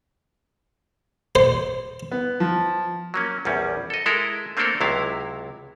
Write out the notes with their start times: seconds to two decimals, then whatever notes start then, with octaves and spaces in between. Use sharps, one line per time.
1.36 C5
2.11 B3
2.40 F3
3.14 F#3 A#3 C#4
3.45 A#1 E2 G3 C#4
3.90 A4 D#5
4.06 G#3 E4 A4 A#4
4.57 A3 A#3 C4 D4 A4 A#4
4.80 C#2 C3 F#3 E4 F5